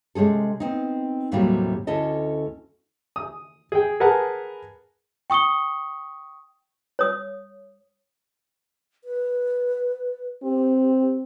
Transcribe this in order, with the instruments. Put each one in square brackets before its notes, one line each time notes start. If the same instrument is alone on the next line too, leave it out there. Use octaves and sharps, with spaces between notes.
[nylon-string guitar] C3 G#3 C#4 G#4 A4
B3 C4 D#4
D#2 A2 C3 F#3 G3 A#3
D2 C#4 E4 A4 D#5
[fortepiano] D#6
G#4 G5
G#4 A#4 B4 F#5 G#5 A5
[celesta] G5 C#6 D#6 C#7 G7
[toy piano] C#5 D#6
[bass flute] B4
[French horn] C4 [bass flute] G4